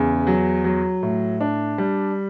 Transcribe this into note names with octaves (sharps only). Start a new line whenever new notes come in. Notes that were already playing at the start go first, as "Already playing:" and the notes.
Already playing: E2 C#3
F#3
F#3
A2
D4
G3